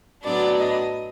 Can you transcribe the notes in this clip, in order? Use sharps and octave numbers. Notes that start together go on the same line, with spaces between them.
A2 F#3 B3 D4 D5
D#5